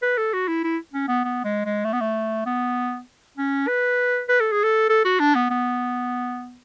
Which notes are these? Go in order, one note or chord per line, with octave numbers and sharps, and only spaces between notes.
B4
A4
F#4
E4
E4
C#4
B3
B3
G#3
G#3
A3
B3
A3
B3
C#4
B4
B4
A4
G#4
A4
A4
F#4
D4
B3
B3